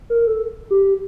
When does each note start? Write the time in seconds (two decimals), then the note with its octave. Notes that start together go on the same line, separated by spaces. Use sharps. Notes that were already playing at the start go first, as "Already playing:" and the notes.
0.10 A#4
0.27 A4
0.71 G4